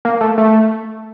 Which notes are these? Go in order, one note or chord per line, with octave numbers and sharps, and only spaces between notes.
A#3
A3
A3